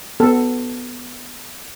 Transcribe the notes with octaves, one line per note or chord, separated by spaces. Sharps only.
B3 A4